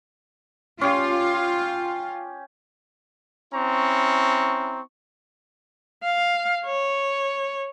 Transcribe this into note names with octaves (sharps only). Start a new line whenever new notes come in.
C#4 F4 G4
C4 C#4 E4 A#5 C#6
F5
C#5